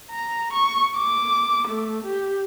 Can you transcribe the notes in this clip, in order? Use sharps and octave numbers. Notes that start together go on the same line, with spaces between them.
A#5
C#6
D6
A3
G4